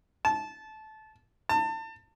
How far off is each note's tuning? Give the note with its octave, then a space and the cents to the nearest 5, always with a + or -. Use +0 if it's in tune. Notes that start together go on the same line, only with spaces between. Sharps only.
A5 -20
A5 +30